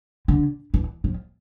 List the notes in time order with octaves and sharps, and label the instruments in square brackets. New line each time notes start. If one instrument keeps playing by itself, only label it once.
[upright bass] D3
E3
F3